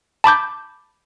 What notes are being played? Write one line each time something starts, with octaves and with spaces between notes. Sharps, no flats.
A5 B5 D6 G6